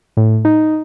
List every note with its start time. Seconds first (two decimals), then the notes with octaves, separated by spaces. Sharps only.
0.17 A2
0.45 D#4